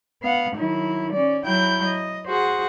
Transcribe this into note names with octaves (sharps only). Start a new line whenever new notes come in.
B3 F5 F#5
D#3 F#3 E4
C#4 D5
F#3 E4 G5 B5 G6
D#5
F#4 G#4 C5 F#5